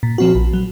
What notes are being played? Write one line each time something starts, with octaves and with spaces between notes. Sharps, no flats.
A#2
F3 C4 F#4
A#1
F#3